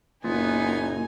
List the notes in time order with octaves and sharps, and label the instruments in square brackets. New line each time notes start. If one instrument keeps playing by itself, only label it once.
[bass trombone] F#1 [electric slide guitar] A#2 [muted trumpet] B3 [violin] D#4 G#5